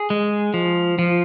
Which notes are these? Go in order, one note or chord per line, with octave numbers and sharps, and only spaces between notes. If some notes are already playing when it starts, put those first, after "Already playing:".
Already playing: G#4
G#3
F3
F3